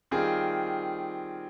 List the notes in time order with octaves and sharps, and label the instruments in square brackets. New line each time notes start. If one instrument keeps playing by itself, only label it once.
[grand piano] D#3 G3 C4 F4 G#4